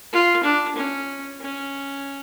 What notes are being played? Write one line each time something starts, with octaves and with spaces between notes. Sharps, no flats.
F4
D4
C#4
C#4